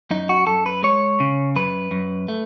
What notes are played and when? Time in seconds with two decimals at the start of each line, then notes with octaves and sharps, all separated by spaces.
0.11 F#2 D#4
0.29 F#4
0.47 F#2 A4
0.66 B4
0.83 G#3 C#5
1.20 C#3
1.56 F#2 B4
1.91 F#2
2.28 A3